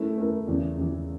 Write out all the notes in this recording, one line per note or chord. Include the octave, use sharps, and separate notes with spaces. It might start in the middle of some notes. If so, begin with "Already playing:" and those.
Already playing: A3 C#4 E4 A#4
A3 C#4 E4 A#4
E2 C#3 E3
E2 C#3 E3